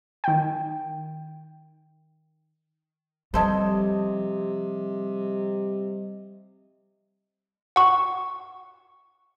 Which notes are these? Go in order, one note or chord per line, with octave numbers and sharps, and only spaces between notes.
D#3 G5
C3 F3 G3 C#4 A4 C5 D#5
F#5 C#6